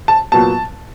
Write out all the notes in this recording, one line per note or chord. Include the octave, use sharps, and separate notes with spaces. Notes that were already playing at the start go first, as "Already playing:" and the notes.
A5
A#2 F#3 B3 A5